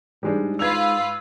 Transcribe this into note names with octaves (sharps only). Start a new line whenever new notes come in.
G#2 G3 G#3 D4
F4 B4 F5 E6 G#6 F7